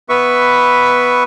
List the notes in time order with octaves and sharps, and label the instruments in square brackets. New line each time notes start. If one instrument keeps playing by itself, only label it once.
[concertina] B3 B4 E5 C#6